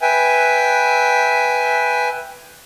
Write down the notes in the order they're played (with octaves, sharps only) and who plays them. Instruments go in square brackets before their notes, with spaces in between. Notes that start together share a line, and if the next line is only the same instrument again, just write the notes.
[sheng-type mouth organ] B4 E5 G5 G#5